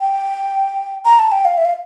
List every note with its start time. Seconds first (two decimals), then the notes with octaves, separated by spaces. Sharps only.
0.01 G5
1.05 A#5
1.19 A5
1.32 G5
1.45 F5
1.58 E5
1.65 F5